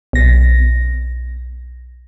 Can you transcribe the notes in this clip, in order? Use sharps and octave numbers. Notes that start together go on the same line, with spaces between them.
B1 A#6